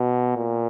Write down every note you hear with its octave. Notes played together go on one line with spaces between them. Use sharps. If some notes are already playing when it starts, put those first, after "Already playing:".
Already playing: B2
A#2